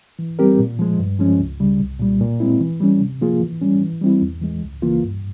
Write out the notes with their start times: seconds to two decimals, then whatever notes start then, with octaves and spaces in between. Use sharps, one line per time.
0.19 E3
0.39 G3 C4 G4 A#4
0.59 A#2
0.79 F3 G#3
0.99 G2
1.19 F3 G#3 C#4
1.40 C#2
1.60 C#3 G3
1.80 C2
2.00 A#2 G3
2.20 A#2
2.40 G#3 C4 E4
2.60 E3
2.80 G3 C#4
3.00 C3
3.21 F3 A#3 F4 G#4
3.41 E3
3.61 G3 C#4
3.81 E3
4.01 G3 C4 E4
4.22 E2
4.41 E3 G#3
4.62 C#2
4.82 C#3 E3 A#3 F4
5.02 G2